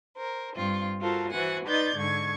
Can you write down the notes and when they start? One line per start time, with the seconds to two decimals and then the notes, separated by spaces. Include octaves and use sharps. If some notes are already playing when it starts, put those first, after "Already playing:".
0.16 A#4 C5
0.54 G2 C4 F4
1.01 F4 F#4 A4 A#4 C5 A5
1.30 E3 F#4 B4 C5 F#5 G#5
1.65 D#4 B4 D5 C6 G6 A6
1.96 G#2 D3 C#6 G#6